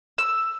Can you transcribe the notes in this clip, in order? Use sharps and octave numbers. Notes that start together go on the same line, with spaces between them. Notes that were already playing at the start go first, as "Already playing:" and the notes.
E6